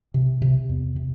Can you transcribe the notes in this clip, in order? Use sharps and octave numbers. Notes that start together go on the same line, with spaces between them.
C3
C3
E2
C3